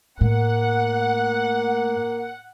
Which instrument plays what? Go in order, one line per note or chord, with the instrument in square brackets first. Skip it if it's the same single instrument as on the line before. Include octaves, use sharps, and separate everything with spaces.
[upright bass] A2 [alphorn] A#3 [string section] F#5